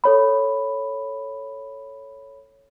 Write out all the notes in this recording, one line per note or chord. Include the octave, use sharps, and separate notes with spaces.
A4 C#5 B5